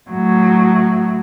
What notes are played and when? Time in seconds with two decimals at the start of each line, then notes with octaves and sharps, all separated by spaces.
0.11 A2 F#3